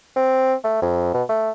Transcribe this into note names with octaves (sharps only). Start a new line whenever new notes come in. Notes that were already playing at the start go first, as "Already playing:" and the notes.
C4
A3
F2
B2
A3